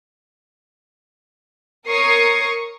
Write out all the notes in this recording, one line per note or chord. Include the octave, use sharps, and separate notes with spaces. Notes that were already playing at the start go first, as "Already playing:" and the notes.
A#4 C#5 C#6 D#6 C7